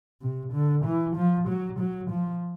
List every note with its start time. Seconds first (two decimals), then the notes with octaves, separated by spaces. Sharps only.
0.22 C3
0.53 D3
0.85 E3
1.16 F3
1.48 F#3
1.80 F#3
2.10 F3